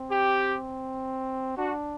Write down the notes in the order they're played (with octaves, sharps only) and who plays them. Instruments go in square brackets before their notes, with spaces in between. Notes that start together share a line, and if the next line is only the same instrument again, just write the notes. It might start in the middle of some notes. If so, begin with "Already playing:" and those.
Already playing: [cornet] C4
[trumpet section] G4
[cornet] D4 [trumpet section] F#4